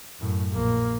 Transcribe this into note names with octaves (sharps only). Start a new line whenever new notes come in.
F#2 A2
A#1 A#3